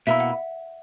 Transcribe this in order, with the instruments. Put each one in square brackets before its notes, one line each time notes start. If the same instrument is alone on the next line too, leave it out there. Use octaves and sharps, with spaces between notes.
[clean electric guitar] B2 A#3 E4 [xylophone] E5
[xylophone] F#5